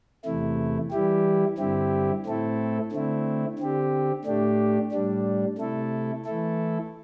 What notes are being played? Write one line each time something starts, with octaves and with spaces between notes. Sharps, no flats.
E2 C3 A3 E4
E3 G3 E4 G4
G2 D3 C4 E4 G4
A2 A3 C4 E4 A4
D3 A3 C4 E4
D3 C4 G4
A2 A3 D4 G4
A2 G3 D4
C3 A3 E4 A4
E3 A3 E4 A4